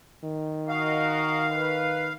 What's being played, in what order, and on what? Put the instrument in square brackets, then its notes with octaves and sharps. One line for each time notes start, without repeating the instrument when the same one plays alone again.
[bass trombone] D#3
[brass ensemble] F#4 A#4 D#5 [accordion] F5
[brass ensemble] B4